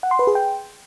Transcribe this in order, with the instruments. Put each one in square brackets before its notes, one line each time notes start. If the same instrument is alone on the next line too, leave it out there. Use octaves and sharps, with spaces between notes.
[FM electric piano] F#5
C6
B4
G#4
G5